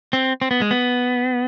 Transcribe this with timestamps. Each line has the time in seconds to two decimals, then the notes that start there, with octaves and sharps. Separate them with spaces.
0.13 C4
0.42 C4
0.51 B3
0.61 G#3
0.71 B3